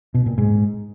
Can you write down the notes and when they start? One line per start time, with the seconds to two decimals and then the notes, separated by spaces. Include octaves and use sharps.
0.14 B2
0.26 A#2
0.38 G#2